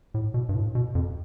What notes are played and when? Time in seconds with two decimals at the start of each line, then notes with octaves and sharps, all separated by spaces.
0.14 A2
0.34 B2
0.49 G2
0.55 A2
0.75 B2
0.95 F2